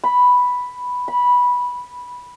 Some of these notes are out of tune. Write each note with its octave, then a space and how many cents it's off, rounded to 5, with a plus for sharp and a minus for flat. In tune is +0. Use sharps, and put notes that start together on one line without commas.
B5 +0
B5 -10